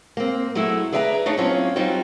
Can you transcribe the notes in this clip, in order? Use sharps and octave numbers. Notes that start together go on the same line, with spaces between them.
A#3 C4
F#3 G#3 A3 E4
G#4 B4 D5 E5 G#5 A#5
A3 D4 D#4 G#4 C#5
F#3 A#3 C4 C#4 F4
F#3 G3 C4 D#4 F4 F#4